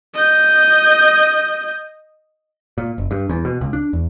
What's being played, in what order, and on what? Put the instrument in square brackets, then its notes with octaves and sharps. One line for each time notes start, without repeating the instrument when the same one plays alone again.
[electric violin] D#5 G6
[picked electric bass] A#2
F#1
G2
E2
B2
C#2
D4
E2